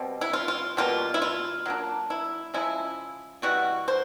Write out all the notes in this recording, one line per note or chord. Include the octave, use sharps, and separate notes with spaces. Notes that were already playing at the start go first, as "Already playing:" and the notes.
Already playing: B2 G3 C4
E4
F4
F4
B2 G3 A#3 F4
E4
F4
F#3 A#3 D4
E4
C#3 F3 G#3 E4
B2 G3 B3 E4 F#4
C5